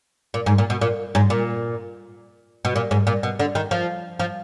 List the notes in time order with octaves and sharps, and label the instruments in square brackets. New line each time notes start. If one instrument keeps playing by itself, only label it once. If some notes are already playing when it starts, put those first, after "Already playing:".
[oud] A#2
G#2
A#2
B2
A#2
G#2
A#2
B2
A#2
G#2
A#2
B2
D3
D#3
F3
F3